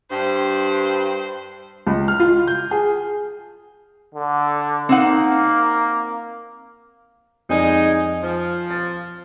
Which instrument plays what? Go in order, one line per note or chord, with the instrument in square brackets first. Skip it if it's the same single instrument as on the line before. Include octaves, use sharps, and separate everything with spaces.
[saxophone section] G2 [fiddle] C5
[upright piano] C#2
F6
F4
G6
G#4
[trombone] D3
[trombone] A#3 [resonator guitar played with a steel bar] C4 D#4 F#5
[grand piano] F2 D5 G#5 [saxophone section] G#3 D#4
[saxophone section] F3
[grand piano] A6